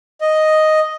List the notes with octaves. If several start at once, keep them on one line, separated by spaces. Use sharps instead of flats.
D#5